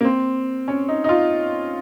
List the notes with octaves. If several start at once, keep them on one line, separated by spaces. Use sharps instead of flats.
A#3
C4
C#4
D#4
D#4
F4